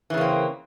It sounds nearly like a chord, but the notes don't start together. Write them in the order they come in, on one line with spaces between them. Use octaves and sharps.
E3 C#3 A#3 C4